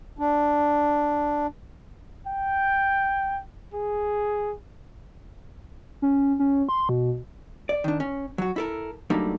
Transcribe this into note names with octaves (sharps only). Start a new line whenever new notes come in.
D4
G5
G#4
C#4
C#4
C6
B2
D5
D#3 D4
C#4
F#3 F#4
E4 A4 A#4
F#3 G3 A3 A#3 D4 D#4